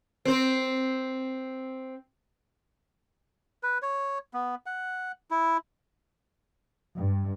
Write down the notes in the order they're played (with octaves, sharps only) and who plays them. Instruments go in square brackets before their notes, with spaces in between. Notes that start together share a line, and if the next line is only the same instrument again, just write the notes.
[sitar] C4 C5
[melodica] B4
C#5
B3
F#5
E4
[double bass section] G2